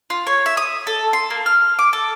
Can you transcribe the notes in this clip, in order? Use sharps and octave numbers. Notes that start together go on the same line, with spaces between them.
F4
C#5
E5
D#6
A4
C6
A#3
F6
D6
A4